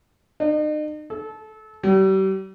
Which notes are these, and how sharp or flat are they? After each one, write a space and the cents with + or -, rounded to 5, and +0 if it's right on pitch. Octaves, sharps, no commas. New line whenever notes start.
D#4 -40
A4 -25
G3 -40